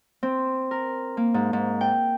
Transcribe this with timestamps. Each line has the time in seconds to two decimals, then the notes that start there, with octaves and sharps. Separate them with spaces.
0.23 C4
0.71 A#4
1.17 A#3
1.34 G#2
1.53 G#2
1.81 G5